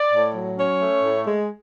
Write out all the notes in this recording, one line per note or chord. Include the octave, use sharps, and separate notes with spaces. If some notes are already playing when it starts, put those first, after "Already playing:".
Already playing: D5
A2
F#3
C#4 C#5
A3
A2
G#3